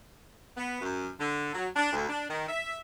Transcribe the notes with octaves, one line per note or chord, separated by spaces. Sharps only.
B3
F#2
D3
F#3
D4
D2
D4
D#3
E5